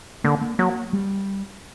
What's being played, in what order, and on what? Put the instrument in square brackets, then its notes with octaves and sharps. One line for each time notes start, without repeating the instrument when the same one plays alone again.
[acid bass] D3 [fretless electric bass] A#3
[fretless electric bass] A#3
[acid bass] F#3 [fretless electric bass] A#3
[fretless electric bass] G3